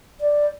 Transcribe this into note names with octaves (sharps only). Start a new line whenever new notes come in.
D5